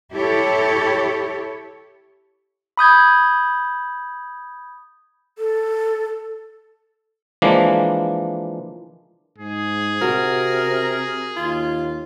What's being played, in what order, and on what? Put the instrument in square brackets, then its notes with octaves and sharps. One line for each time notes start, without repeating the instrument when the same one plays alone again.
[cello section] E4 G4 A4 C#5
[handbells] B5 D#6 G6 G#6
[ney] A4
[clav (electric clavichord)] E3 F3 G#3 A#3 D4
[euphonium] G#2 [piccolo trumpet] G#4
[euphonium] C3 [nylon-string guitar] F#4 [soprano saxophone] A#4
[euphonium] D#2 [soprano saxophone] F4